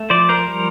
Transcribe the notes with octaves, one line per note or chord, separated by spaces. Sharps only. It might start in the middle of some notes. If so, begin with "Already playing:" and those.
Already playing: A3
F3 C5 D5
A#4 C5
G3